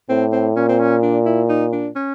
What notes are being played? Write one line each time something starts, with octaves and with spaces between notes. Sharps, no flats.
A2 C4
C4
A#2 C#4
C4
C#4
D4
E4
D#4
D4
C#4